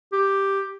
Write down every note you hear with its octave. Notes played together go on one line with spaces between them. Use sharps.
G4